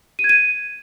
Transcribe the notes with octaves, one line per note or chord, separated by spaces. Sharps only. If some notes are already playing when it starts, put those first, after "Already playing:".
D#7
G#6
D#7